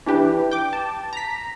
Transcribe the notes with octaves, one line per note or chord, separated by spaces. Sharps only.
E3 D4 G4 B4
G5 D6
A5
A#5 B6